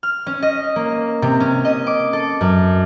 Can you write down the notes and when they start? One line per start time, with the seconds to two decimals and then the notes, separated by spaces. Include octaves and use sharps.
0.03 F6
0.26 C#4
0.42 D#5
0.76 A#3
1.22 C3
1.40 C#4
1.65 D#5
1.87 D6
2.13 A4
2.41 F#2